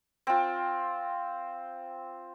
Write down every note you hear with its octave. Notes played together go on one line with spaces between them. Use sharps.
C4 F4